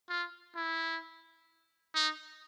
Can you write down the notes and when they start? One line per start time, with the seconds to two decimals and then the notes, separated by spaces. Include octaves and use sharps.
0.09 F4
0.56 E4
1.95 D#4